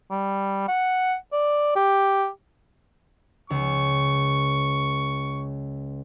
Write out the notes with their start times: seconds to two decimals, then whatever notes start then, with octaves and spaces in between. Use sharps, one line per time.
0.10 G3
0.68 F#5
1.32 D5
1.75 G4
3.50 C#2 C#6